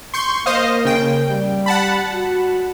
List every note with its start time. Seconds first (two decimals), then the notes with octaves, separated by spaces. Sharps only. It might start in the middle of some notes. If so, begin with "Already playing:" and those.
0.14 C6 C#6 G6
0.46 A#3 C5 D#5 F5
0.85 C#3 G5
1.30 G3
1.66 F#5 A5 B5
2.13 F#4